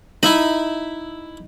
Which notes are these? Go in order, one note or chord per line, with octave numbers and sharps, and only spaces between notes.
D#4 E4 E5 B5